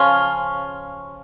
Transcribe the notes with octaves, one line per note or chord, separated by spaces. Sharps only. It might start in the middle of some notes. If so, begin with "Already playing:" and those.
Already playing: C#3 F3 C#4 F4